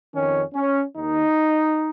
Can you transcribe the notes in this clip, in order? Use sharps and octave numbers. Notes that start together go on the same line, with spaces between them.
F2 D#3 C#4
C#4
D#2 D#3 D#4